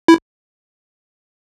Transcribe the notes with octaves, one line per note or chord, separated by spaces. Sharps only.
E4